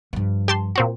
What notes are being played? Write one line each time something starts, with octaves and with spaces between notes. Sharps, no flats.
G2 F3
G4 A5 C6
A#2 C4 F#4